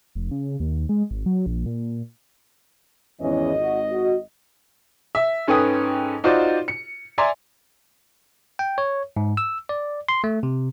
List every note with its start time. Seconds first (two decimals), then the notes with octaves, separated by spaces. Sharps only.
0.15 F1
0.31 C#3
0.60 D#2
0.89 G#3
1.11 G#1
1.26 F#3
1.46 A#1
1.66 A#2
3.21 G#1 E2 E3 C#4 D#5
3.60 F#4
3.91 F#4
5.15 E5
5.48 G#2 C#4 A4 B4 G5 D#6
6.24 D#4 F4 F#4 C5 D5
6.68 C#7
7.18 D5 E5 G#5 A#5 C6
8.59 G5
8.78 C#5
9.17 G#2
9.37 E6
9.69 D5
10.09 C6
10.24 A3
10.43 C3